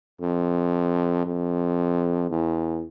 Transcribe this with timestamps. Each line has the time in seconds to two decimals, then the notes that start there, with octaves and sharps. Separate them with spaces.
0.21 F2
1.26 F2
2.30 E2